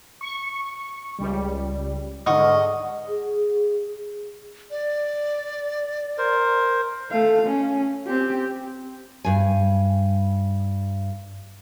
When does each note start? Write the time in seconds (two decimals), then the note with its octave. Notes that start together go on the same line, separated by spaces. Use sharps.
0.21 C#6
1.19 C#2 G3
2.26 G#2 D3 D#5 F#5 C#6 F6
3.08 G#4
4.71 D5
6.18 A#4 C5
7.12 A3 F5
7.47 C#4
8.06 C4 G4
9.25 G2 G#5